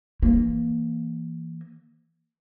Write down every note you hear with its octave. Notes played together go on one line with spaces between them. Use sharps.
E3 A#3